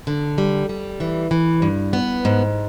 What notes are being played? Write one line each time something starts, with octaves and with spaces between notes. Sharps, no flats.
D3
G3
G3
E3
E3
G2
B3
G#2